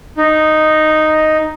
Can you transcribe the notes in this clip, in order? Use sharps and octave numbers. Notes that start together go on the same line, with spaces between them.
D#4